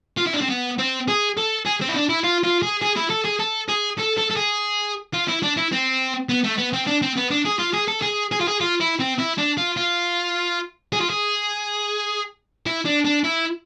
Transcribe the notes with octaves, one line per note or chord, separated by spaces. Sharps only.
F4
E4
D4
C4
B3
C4
G#4
A4
G#4
C4
E4
D4
E4
F4
F4
G#4
G#4
E4
A4
G#4
A4
G#4
A4
A4
A4
G#4
F4
E4
D4
E4
C4
B3
A3
B3
C4
D4
C4
B3
D4
G#4
F4
G#4
A4
G#4
G#4
F4
G#4
F4
E4
C4
E4
D4
F4
F4
G#4
F4
G#4
E4
D4
D4
E4